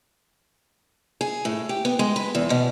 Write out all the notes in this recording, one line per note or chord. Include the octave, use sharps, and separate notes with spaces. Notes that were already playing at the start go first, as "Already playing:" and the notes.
G#4
A2
G4
B3
G#3
B4
E2
B2